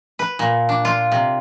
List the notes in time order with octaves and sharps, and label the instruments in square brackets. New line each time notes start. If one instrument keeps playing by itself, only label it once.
[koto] B4
A#2
D4
F4
C3